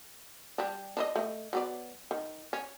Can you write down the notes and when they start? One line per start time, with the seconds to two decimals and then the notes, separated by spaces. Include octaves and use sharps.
0.58 G3 D4
0.97 D4 B4 D#5
1.16 A3 D#5
1.53 F#3 B3 D5
2.11 D#3
2.53 C#4